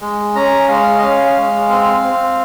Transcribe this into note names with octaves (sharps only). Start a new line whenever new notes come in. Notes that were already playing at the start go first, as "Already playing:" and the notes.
G#3
C#4 A#5
G#3 F5
D#5
C#4 F5
G#3
C4
C4